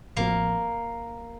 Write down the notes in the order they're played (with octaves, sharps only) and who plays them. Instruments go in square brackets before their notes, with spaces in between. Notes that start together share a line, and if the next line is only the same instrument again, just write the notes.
[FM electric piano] A1 A2 F3 C4 F#4 [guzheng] A#3